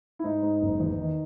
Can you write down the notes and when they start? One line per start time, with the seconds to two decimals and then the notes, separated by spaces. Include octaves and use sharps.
0.19 E4
0.24 G#2 D#4
0.42 G#2
0.61 F#1
0.80 E2
0.99 D#3